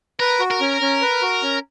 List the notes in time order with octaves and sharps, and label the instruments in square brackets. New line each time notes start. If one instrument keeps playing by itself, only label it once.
[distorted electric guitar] A#4 [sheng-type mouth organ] B4
[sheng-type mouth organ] F#4
[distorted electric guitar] A#4
[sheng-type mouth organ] C#4
C#4
B4
F#4
C#4